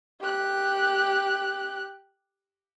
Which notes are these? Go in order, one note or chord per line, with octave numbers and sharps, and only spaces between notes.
G4 F#6